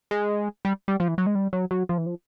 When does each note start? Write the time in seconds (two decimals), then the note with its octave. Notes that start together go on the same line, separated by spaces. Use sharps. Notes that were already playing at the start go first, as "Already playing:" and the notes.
0.11 G#3
0.65 G3
0.88 G3
1.00 F3
1.08 E3
1.18 F#3
1.26 G#3
1.35 G3
1.53 F#3
1.71 F#3
1.89 F3
1.98 E3
2.06 F3